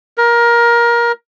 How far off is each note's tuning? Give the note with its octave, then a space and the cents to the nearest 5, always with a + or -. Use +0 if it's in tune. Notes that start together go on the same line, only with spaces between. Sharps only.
A#4 +20